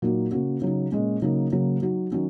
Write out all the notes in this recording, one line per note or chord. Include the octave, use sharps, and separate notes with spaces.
A#2 F#3 D#4 F#4
C#3 A#3 C#4 F#4
C#3 F#3 D#4
A#2 G#3 C#4
C#3 F#3 A#3 D#4
C#3 F#3 A#3
F#3 D#4 F#4
D#3 F#3 C#4 F#4